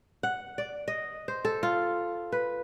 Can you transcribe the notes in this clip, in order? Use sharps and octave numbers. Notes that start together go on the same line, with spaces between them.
F#5
D5
D#5
C5
A4
F4
B4